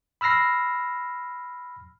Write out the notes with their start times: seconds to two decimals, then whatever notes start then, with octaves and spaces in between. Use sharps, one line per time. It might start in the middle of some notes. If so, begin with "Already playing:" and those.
0.21 B5 E6 F6 A#6 C7